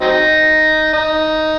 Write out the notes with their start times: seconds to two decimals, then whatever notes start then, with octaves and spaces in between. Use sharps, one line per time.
0.01 F#3 C4 D#4
0.93 D#4